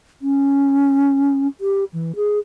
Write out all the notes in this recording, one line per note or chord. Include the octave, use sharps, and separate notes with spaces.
C#4
G4
E3
G#4